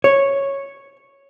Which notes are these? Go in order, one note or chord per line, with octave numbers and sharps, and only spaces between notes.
C#5